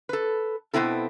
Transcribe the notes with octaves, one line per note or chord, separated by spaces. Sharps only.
A4 B4
B2 D3 B3 C4 E4 A4